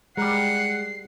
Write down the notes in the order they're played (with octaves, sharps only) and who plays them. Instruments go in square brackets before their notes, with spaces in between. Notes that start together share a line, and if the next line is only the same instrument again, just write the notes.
[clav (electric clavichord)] G3 A#4 [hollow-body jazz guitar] G#3 [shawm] F#5 [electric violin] C7